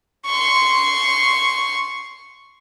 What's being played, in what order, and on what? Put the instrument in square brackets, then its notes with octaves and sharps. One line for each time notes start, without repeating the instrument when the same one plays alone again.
[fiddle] C6 C#6